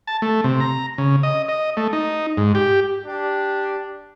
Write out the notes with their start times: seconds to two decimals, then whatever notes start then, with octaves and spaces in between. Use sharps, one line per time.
0.07 A5
0.22 A3
0.44 C3
0.60 A#5
0.98 C#3
1.23 D#5
1.49 D#5
1.77 A3
1.93 D#4
2.37 G#2
2.55 G4
3.06 D4 G4